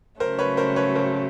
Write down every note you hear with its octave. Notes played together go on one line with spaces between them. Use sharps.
C#3 F#3 A3 C#4 A#4 C5
B4 C#5
A#4 C5
B4 C#5
A#4 C5